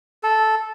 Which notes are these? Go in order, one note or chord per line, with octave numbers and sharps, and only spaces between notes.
A4